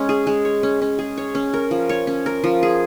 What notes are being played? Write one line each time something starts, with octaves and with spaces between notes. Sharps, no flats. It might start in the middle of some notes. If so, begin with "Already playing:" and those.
Already playing: G#3 C#4
G#4
G#3
C#5
C#4
C#4
G#4
C#5
C#4
A#4
F3
C#5
C#4
A#4
F3
G#4